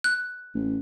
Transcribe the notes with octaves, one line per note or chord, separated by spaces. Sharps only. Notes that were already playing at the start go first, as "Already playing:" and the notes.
F#6
A1